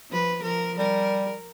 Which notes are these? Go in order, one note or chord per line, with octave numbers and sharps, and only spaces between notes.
F3 B4
F3 A#4
G3 A#4